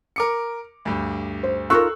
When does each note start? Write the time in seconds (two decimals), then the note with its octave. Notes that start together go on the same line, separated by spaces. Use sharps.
0.16 A#4 D6 C#7
0.85 D2 G2
1.43 C5
1.70 D#4 F4 A4 A#4 C#6 E6 F#6